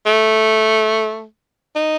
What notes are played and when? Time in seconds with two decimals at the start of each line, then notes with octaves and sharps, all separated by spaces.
0.06 A3
1.75 D#4